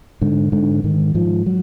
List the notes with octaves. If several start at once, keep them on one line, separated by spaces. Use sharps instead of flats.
G#2 D3
G#2 D3
G#2 D#3
G#2 F3
F#3